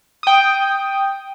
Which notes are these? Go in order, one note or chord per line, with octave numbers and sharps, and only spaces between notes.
G5 D#6